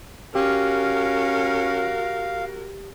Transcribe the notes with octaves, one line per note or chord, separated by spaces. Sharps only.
C#4 F#4 G4 A#4 F5